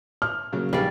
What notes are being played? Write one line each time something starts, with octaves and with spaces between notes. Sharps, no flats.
F6
C#3 F#3 A#3
A#1 G3 G#4 D5 F5